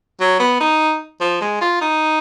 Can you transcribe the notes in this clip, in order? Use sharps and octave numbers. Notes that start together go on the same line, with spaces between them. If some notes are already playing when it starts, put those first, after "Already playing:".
F#3
B3
D#4
F3
G#3
F4
D#4